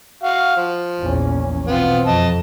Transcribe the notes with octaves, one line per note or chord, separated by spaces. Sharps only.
F#4 F5
F3
A#1 E2 C#4
B2 B3 C4 F4
F2 D#5 A5